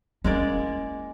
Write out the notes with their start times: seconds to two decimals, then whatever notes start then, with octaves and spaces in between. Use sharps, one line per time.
0.24 G#3 A#3 C#4 E4 D5